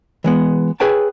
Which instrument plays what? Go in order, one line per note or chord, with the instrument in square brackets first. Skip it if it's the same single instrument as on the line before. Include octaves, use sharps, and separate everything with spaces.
[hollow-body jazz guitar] E3 G#3 B3
G#4 B4 C#5 G5 A5